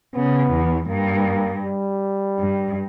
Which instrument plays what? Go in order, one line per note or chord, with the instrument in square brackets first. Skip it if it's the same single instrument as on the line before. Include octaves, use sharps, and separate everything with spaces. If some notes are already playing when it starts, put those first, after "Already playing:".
[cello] C#3 [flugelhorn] B3
[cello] E2
[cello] G2 [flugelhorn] A#3
[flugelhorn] G3
[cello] G2